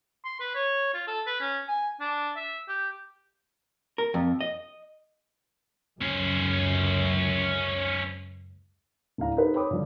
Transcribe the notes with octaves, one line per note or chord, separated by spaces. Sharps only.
C6
B4
C#5
F4
A4
B4
C#4
G#5
D4
E5
G4
A#4
F2
D#5
C#2 F#2 C#4 C5
D1 D4 E4 F5 A#5
D#4 G4 A4 B4 C5
C#5 G5 B5 D6 D#6
G2 D3 F3 D4